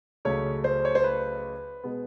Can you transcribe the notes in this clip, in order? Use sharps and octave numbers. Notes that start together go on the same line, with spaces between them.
C#2 C#3 F#3 A3 C#4 C#5
C5
C#5
C5
B4
B2 G#3 B3